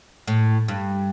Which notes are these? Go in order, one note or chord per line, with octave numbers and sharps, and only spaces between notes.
A2
G2